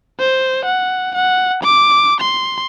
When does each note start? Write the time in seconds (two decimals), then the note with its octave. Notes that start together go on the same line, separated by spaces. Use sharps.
0.19 C5
0.65 F#5
1.15 F#5
1.63 D6
2.20 C6